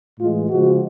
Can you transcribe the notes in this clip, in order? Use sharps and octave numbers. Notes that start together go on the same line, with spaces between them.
A2 E3 G#3 F4
C#3 F3 G#3 F#4